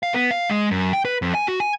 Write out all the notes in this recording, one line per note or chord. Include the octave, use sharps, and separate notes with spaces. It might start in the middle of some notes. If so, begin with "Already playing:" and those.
F5
B3
F5
G#3
F#2
G5
B4
F2
G#5
F#4
G#5